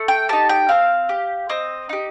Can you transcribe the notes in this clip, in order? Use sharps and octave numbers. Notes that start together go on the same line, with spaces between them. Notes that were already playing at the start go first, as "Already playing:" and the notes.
Already playing: A3
G5
D#4 G4 A5
G5
C4 F5
G4
C4 D#5
D#4 G4